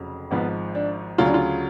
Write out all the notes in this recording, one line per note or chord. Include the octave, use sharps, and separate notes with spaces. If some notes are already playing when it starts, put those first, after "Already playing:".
Already playing: F1 F2 C#3 F#3
G#1 G#2 F3 B3
D4
D2 C#3 F#3 F4
D4
F4